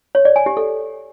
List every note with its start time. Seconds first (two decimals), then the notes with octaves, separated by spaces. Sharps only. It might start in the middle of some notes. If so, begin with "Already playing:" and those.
0.15 C#5
0.25 D5
0.36 G#5
0.46 G4
0.57 A4